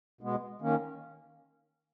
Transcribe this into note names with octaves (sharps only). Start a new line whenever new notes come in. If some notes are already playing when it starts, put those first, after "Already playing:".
B2 G#3 B3
D#3 A#3 C#4